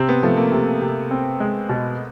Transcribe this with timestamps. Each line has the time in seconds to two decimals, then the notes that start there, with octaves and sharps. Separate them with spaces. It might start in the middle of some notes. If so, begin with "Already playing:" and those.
Already playing: C3 C4
0.09 B3
0.23 F3 A3
0.37 A#3
0.52 C3
0.82 C3
1.11 C4
1.40 G#3
1.69 B2